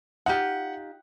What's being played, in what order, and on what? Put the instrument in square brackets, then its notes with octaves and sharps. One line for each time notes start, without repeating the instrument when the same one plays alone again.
[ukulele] D#4 F4 G4 [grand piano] F#5